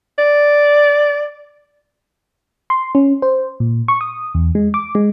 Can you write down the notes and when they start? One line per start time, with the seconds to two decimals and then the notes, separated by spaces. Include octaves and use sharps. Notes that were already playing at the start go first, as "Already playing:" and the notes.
0.18 D5
2.70 C6
2.95 C#4
3.22 C5
3.60 A#2
3.88 C#6
4.01 D#6
4.35 E2
4.55 G#3
4.74 D6
4.95 G#3